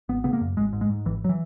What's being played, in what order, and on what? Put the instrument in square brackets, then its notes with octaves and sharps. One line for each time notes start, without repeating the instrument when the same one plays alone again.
[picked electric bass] G#1 B3
C#3 B3
A#3
F#2
G#1 G#3
G#2
G#3
G#2
G#1 E3
F#3
E3